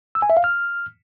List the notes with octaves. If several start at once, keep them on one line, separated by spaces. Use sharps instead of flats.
E6
G#5
E5
F5
F6